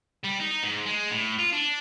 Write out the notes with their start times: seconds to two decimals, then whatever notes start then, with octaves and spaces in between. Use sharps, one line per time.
0.24 G3
0.40 D#4
0.63 G#2
0.86 G#3
1.11 A2
1.38 F4
1.53 D4